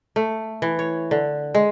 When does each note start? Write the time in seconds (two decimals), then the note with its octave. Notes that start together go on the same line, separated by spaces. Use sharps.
0.16 A3
0.62 E3
0.79 C#5
1.11 D3
1.55 G#3